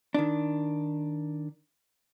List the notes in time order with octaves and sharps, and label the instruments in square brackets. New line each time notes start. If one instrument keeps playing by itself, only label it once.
[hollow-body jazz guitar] D#3 D4